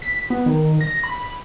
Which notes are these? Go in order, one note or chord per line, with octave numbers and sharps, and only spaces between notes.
B6
B3
D#3
A#6
B5